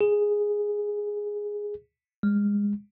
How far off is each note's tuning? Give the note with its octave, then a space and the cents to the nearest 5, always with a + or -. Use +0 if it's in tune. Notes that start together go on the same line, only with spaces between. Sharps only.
G#4 -5
G#3 -25